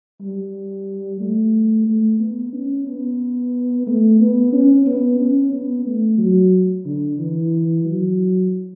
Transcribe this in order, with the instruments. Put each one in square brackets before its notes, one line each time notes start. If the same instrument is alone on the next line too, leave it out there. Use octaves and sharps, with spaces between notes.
[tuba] G3
A3
A3
B3
C#4
B3
A3
B3
C#4
B3
C#4
B3
A3
F#3
D3
E3
F#3